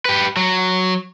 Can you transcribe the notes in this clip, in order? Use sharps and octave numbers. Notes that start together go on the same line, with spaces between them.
G4 B4
F#3